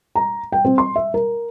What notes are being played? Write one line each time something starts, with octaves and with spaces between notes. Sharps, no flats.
A#5
G5
C4
C6
E5
A#4